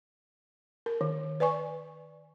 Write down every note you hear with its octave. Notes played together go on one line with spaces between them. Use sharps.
A#4
D#3
B4 D5 G#5 C#6